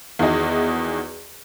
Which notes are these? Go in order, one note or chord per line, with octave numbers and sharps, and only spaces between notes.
E2 D#3 E4 F#4 G#4 D#5